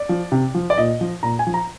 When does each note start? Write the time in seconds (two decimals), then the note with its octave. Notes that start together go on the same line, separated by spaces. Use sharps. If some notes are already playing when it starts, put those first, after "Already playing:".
Already playing: D5
0.09 F3
0.32 C3
0.55 F3
0.70 D5
0.78 A#2 D#5
1.01 F3
1.23 A#2 A#5
1.39 G#5
1.47 F3
1.54 A#5